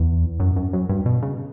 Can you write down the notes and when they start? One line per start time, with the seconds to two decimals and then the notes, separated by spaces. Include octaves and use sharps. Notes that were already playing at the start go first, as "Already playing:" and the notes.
Already playing: E2
0.40 F#2
0.56 F#2
0.73 F#2
0.89 G2
1.06 B2
1.23 C#3